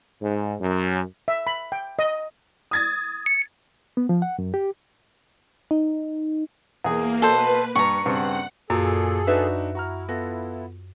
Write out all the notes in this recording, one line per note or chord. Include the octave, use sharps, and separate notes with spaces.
G#2
F#2
E5
B5
G5
D#5
D#6 G#6 A6
C#7
B3
F3
F#5
F#2
G4
D#4
E2 A#3 G#4
B2 A4 B4 C5
G2 A#5 C#6 C#7
G2 C#3 C4 F#5
F#2 A#2 G#4 A4
D4 D#4 F#4 B4 E5
E4 F#4 A#5 F6
B3 F4 F#4 A4